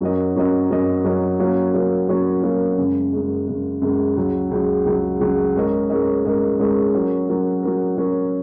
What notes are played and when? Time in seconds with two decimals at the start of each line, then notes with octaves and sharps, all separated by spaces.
0.01 F#2 F#3 C#4 A#4 D#5
0.36 F#2 F#3 C#4 A#4 D#5
0.70 F#2 F#3 C#4 A#4 D#5
1.04 F#2 F#3 C#4 A#4 D#5
1.40 F#3 A#3 C#4 A#4
1.74 F#3 A#3 C#4 A#4
2.09 F#3 A#3 C#4 A#4
2.43 F#3 A#3 C#4 A#4
2.78 F#2 C#3 G#3
3.13 F#2 C#3 G#3
3.47 F#2 C#3 G#3
3.82 F#2 C#3 G#3
4.16 C#2 C#3 F#3
4.51 C#2 C#3 F#3
4.86 C#2 C#3 F#3
5.20 C#2 C#3 F#3
5.55 G#2 G#3 C#4 A#4 D#5
5.90 G#2 G#3 C#4 A#4 D#5
6.25 G#2 G#3 C#4 A#4 D#5
6.59 G#2 G#3 C#4 A#4 D#5
6.94 F#3 C#4 A#4
7.28 F#3 C#4 A#4
7.63 F#3 C#4 A#4
7.98 F#3 C#4 A#4